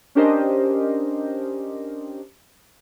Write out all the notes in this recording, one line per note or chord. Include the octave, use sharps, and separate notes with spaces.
C#4 D4 G4 A#4 C5 D#5